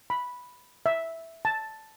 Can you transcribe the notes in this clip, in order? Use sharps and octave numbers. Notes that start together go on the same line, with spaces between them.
B5
E5
A5